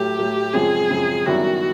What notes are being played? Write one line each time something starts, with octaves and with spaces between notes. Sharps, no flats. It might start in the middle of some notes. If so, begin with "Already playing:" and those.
Already playing: A2 F#3 A3 G4
A2 F#3 A3
F#2 C#3 F3 G#3 C4 G#4
F#2 C#3 F3 G#3 C4
F#2 D#3 G3 B3 E4 F#4